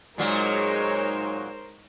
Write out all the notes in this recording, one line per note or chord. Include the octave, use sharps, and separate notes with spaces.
A#2 F#3 G#3 A#3 D#4 A#4 C5 C#5